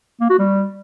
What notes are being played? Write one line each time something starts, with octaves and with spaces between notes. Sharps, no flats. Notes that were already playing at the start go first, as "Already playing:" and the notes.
A#3
F#4
G3